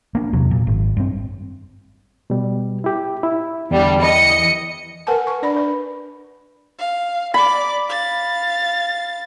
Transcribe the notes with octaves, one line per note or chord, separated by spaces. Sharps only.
A#3 D4
E2 C3 F#3
A#2
G#1
G2 C4
B2 G3
E4 G4
E4
E2 D3 G3 D4
E3 D#5 C#7
A#4 B4 F#5 G#5 A5
C#6
D4 D5 B5
B4
F5
D5 B5 D6
F5 A6